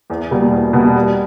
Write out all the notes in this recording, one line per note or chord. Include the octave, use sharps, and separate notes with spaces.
E2
B2 G3 A#3
E2
B2 G3 A#3
G3